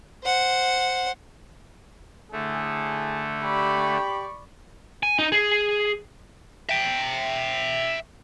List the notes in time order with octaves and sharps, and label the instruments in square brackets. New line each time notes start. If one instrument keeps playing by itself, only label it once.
[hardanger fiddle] C5 F#5
[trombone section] A2 G#4 [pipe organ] D3 A3
[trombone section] G4 [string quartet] D5 C#6 [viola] B5
[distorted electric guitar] G#5
D#4
G#4
E5 G5